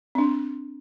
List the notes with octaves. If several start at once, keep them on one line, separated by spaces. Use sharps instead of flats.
C4 D4